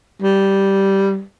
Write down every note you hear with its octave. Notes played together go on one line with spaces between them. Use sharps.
G3